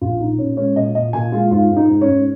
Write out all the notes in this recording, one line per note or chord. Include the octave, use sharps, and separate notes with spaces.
A#1 F4
A#2 D#4
A#2 C#4
G#3 C#4
A#2 D#5
A#2 D#5
A#2 G#5
G#3 F4
G#2 F4
G#2
D#4
G#2
C#4
G#2